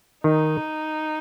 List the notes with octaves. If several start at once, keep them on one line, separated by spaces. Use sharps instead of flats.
D#3 D#4